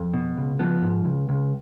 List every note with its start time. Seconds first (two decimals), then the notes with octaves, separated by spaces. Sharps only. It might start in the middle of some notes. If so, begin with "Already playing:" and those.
Already playing: F2
0.14 B2
0.37 C#2
0.59 F3 B3
0.82 G#2
1.05 C#2
1.29 C#2